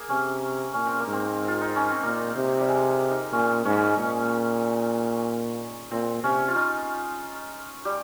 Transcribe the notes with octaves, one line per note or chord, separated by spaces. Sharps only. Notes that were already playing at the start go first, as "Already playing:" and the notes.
Already playing: A#3 G#4
C3 C#4
A#2 C#4
C4
A#3
G#2
C4
F4
D#4
C#4
C4
A#2 A#3
C3
G3
G#3
G#3
D#4
A#2 C#4
G#2 C#4
A#2
A#2 C4
C3 C#4
F4
D#4
G3 G4